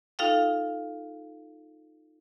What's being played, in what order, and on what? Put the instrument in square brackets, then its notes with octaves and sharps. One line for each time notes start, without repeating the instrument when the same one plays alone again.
[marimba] D#4 F4 A4 F5 G5